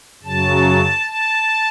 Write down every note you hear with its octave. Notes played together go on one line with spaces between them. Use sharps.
F#2 C#3 F#3 A5
A5